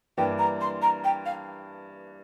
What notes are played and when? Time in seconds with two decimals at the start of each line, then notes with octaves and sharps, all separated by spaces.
0.17 G2 E3 A#3 D4 G5
0.38 A#5
0.61 C6
0.82 A#5
1.04 G5
1.25 F5